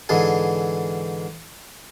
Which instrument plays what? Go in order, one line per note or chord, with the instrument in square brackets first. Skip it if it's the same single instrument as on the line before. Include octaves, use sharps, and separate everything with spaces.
[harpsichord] G#2 D3 E3 G#4